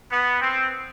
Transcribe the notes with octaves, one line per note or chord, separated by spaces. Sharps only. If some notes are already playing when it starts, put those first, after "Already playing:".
B3
C4